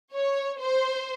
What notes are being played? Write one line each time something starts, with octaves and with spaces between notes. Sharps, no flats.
C#5
C5